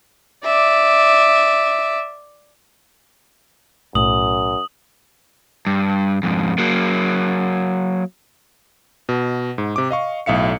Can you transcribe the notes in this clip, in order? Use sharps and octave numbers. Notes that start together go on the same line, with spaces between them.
D5 E5
B1 F#2 A2 D#6 F#7
G2
F2 G#2
F#3 A#3
B2
G#2
C3 D6
D#5 F5 C#6
B1 A2 E5 F5 C#7